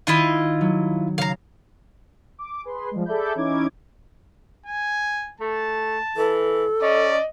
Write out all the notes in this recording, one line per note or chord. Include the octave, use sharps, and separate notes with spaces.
D#3 E4 F4 D#5
F#3
C#3 F5 A#5
D6
G#4 B4 C6
F3 G3 G#3
G#4 A4 D5 E5 B5 G6
E3 C#4 D#4 E4 D6 G#6
G#5
A3 A5
E3 A4
C#4 D5 D#5